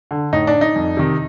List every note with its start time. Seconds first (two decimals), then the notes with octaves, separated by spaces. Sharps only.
0.11 D3
0.33 A2 D#4
0.47 D4
0.61 D#4
0.76 F2
0.97 C3 D#3